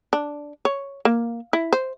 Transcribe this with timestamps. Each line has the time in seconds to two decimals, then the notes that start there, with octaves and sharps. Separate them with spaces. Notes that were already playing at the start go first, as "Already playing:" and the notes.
0.13 D4
0.65 C#5
1.05 A#3
1.53 E4
1.73 C5